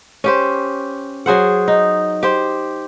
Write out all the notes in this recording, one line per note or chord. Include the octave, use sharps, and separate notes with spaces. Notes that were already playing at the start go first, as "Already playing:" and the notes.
C#4 G4 C5
F#3 G#4 C5 F#5
D#4
G4 C5